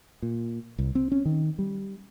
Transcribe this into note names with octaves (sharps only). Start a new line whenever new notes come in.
A#2
C2
C4
C#4
D#3
G3